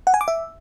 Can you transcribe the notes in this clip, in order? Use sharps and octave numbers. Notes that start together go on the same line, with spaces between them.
F#5
G#5
D6
E5